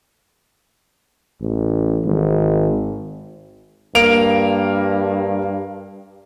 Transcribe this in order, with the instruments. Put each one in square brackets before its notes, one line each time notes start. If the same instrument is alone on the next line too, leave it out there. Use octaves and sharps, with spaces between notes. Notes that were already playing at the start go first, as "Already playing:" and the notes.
[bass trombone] A1
G#1
[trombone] G2 [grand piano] A#3 D7 F7